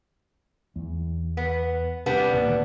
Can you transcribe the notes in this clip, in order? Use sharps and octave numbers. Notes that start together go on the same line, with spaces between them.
E2
B3
C3 G3 B3 D4
D2 A#2 D#3